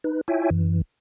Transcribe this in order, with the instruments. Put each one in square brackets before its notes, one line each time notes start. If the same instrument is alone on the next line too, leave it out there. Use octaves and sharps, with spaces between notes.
[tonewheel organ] D#4 B4
E4 F4 C#5 E5 G5 G#5
F#2 E3